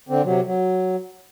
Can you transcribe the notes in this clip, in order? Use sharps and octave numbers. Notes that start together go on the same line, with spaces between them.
D3 C4
C3 F#3
F#3